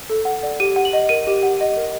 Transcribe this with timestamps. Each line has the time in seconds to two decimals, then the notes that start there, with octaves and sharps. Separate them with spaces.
0.10 A4
0.25 F#5
0.43 D5
0.60 G4 D#7
0.76 F#5
0.85 F#7
0.93 D#5
1.09 A#4 D#7
1.27 G4
1.43 F#5
1.61 D#5
1.76 A#4